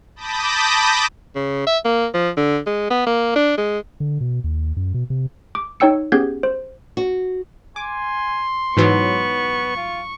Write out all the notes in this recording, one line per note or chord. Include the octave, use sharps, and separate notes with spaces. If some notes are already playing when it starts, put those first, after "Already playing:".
A5 B5 D6 D#6 G6 A#6
C#3
E5
A#3
F3
D3
G#3
B3
A#3
D4
G#3
D3
B2
D#2
F#2
B2
C3
D6
D#4 C#5 G5 E6 C#7
B3 C#4 G4 G#4 G6 G#6
C5
F#4
G#5 C6 D6
G#2 E3 F#3 B3 C#6
F4